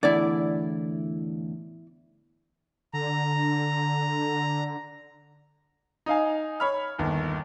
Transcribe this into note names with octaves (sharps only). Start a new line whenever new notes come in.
E2 A2 D3 E4 D5
D3 A#5
D#4 D#5 F5 G#5
C#5 B5 F6
G1 D#2